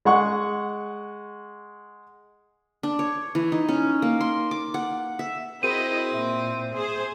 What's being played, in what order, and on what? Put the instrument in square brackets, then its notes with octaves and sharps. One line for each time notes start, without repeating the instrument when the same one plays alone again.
[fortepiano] G#3 F#5 C#6
[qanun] D4
C#5
E3
D#4
C#4
A#3
C6
D6
F#5
E5
[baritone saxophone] C4 [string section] E4 D#5 [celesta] F#4 G#4 A#4 [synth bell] D#7
[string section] A#2 [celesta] E5
[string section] G#4 C5